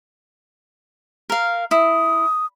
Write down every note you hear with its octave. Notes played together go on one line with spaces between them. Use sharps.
A#4 F5
E4 D#6